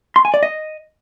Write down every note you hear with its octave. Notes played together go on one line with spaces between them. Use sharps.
C6
G#5
D5
D#5